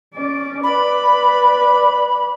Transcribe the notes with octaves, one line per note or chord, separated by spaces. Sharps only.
C#4 D5
B4 D5 B5